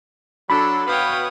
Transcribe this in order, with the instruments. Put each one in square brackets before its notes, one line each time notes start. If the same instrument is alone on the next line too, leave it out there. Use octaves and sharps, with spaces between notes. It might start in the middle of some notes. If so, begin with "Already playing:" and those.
[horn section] F#3 A4 [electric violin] D4 [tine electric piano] B5
[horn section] B2 F#4 B4 [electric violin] C#5 D#6 [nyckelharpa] F5 G5